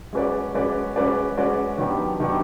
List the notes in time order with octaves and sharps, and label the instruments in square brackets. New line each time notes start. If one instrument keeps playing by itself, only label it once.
[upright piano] G#3 C#4 F#4 B4 D5
G#3 C#4 F#4 B4 D5
G#3 C#4 F#4 B4 D5
G#3 C#4 F#4 B4 D5
D#3 F#3 B3 D4 G4
D#3 F#3 B3 D4 G4